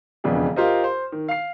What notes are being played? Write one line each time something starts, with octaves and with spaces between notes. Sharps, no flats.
E1 F2 C#3 B3 D4 G#4
F4 G4 A#4 C5 D#5
C5
D#3
F5 C7